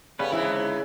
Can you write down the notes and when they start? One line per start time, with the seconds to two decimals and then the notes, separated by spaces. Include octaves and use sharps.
0.19 C#3 G3 A3 B3 C#4 B4
0.32 G#2 D3 E3 G#3 B3 D#4 E4